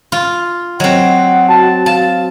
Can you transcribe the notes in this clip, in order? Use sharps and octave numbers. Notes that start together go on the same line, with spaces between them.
F4
F#3 C4 D#5 F#5
F#4 A5
F5 A5